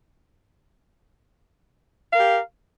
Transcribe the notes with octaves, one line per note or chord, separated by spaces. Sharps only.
G4 A#4 F5